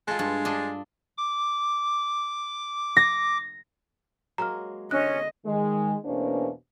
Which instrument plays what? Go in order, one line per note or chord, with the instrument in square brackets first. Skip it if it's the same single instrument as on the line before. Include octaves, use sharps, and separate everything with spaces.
[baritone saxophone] G#3 [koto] F4 A4
[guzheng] G2 [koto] A4
[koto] D4 A4 [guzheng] D#5
[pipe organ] D6
[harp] A#6
[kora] F#3 G#3 A#3 [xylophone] A#5 F6
[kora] D3 G#3 [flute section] C#4 [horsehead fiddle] D#5 [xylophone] F#6
[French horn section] D#3 G#3
E2 B2 A#3 C#4 D4 C5